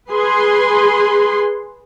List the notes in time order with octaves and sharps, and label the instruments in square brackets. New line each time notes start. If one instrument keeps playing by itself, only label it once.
[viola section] G#4 B4 C6